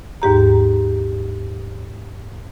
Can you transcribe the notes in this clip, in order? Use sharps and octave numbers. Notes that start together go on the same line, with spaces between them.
D#2 G#2 G4 A#5